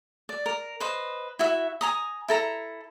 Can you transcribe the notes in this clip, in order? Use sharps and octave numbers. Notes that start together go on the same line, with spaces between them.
D5
A#4
B4 C5 D#5
E4 F#4 E5
G#5 A#5 D#6
E4 A4 A#5